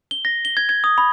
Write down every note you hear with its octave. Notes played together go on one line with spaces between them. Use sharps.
G7
A#6
G7
G#6
G#6
D#6
B5